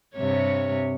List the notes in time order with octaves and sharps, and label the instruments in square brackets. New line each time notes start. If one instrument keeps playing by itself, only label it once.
[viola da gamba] G2 C3 C#5